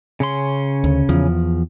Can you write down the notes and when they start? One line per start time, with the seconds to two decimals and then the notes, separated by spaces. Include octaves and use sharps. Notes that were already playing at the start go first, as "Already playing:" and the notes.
0.20 C#3 C#4 C6
0.84 D2
1.09 E2 F3